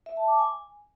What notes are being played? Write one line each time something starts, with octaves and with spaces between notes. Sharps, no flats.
E5
A5
D6
G#5